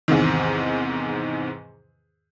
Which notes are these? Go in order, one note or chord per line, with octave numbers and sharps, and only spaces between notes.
E2 G#2 C3 D#3